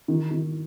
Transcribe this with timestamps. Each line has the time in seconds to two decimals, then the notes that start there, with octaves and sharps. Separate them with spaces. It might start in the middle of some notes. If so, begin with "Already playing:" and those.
0.08 D#3
0.31 D#3